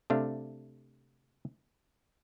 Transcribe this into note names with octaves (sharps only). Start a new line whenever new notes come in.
C3 A3 D4 F5